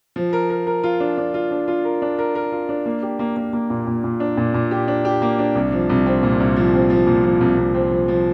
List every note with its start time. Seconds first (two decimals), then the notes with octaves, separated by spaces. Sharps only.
0.16 F3
0.33 A#4
0.50 A#4
0.67 A#4
0.84 F4
1.00 D4
1.17 D4
1.34 F4
1.51 D4
1.68 F4
1.85 A#4
2.02 D4
2.19 A#4
2.35 A#4
2.52 F4
2.69 D4
2.86 A#3
3.03 G4
3.19 A#3
3.36 A#3
3.53 A#3
3.70 A#2
3.87 A#2
4.04 A#2
4.20 D4
4.37 A#2
4.54 A#2
4.71 G4
4.88 D4
5.05 G4
5.22 A#3
5.39 D4
5.55 C2
5.72 F3
5.89 C2
6.06 C4
6.23 A#2
6.40 C2
6.56 F3
6.74 C4
6.90 F3
7.07 A#2
7.24 F3
7.41 C2
7.58 C2
7.74 C4
7.91 F3
8.08 F3